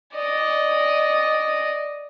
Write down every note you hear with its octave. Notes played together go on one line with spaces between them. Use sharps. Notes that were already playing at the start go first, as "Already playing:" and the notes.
D5 D#5